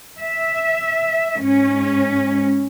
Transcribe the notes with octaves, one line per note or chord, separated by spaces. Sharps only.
E5
G#2 C#4